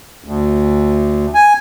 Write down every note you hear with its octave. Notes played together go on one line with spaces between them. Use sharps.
D2
G#5